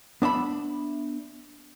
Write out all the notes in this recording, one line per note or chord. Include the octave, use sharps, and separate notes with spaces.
B3 D4 E5 B5